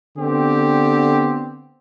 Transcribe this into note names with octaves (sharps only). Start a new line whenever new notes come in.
D3 B3 C4 G4